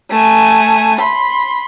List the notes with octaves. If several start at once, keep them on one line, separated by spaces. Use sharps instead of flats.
A3 G#5
B5 C6